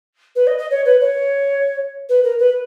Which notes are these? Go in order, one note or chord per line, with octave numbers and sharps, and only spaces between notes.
B4
D#5
D#5
C#5
B4
C#5
B4
A#4
B4